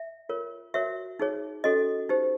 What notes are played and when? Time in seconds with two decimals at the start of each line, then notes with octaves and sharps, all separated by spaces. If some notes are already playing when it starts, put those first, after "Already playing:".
Already playing: E5
0.29 F4 A#4 C#5
0.74 F#4 A#4 C#5 E5
1.20 D#4 G#4 C#5
1.64 C#4 F#4 A4 C#5 D#5
2.09 D#4 G4 C5